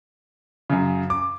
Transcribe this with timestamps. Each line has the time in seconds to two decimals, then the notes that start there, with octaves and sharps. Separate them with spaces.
0.70 F#2 C#3
1.10 D6